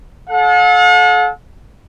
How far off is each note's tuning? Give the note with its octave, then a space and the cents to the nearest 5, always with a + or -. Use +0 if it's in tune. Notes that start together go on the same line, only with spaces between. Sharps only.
A4 -35 F#5 -45